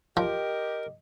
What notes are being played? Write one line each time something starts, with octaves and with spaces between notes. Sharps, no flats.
F3 G4 A#4 D#5